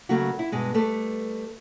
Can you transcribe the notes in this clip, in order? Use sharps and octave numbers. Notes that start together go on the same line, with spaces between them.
C#3 F#3 A3 A#3 F#4
E4
G2 B2 G#3
G3 A3 A4 B4